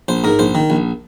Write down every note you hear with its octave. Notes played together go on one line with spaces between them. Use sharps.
A#1 C5
G#2 A#4
A#1 C5
D#3
A#1